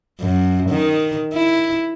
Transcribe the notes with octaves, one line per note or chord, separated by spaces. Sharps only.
F#2
D#3
E4